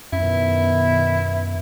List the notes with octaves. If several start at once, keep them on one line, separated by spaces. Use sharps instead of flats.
F#2 B2 D#3 B3 E4